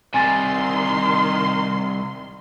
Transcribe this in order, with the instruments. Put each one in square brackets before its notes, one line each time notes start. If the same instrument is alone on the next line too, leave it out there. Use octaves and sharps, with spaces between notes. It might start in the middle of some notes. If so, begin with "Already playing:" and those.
[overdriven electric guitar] C2 C3 [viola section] D#3 C6 [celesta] G#5 A6